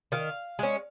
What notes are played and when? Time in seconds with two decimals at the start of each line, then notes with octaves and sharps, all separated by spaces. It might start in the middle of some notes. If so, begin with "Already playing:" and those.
0.12 D#3 F5
0.59 G#3 C#4